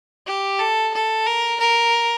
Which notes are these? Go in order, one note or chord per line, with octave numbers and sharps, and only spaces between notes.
G4
A4
A4
A#4
A#4